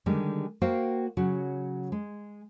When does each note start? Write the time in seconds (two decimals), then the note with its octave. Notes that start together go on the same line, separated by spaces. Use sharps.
0.06 D3 D#3 G3 G#3 G4
0.61 A#3 F#4 A#4 C5 F5 G5
1.17 C#3 F#3 F#4
1.92 G#3